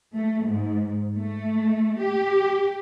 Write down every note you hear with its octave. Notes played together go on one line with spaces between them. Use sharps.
A3
G#2
A3
G4